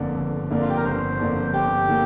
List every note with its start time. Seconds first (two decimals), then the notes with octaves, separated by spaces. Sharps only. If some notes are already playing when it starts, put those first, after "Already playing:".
Already playing: G1 F2 D3 A#3 D4
0.16 G1
0.50 F2 D3 A#3 D4
0.62 F4
0.69 G4
0.77 A#4
0.85 G1 C5
1.19 F2 D3 A#3 D4
1.53 G1 G4
1.88 D3 A#3